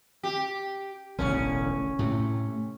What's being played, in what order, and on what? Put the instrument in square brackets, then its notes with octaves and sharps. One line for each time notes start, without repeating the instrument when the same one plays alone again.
[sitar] G4
[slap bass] E1 A1 D3 [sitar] C#4
[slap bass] A2 C3 A3